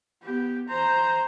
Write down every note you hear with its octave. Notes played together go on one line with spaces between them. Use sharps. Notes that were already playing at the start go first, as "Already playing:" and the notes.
B3 G4
C5 A#5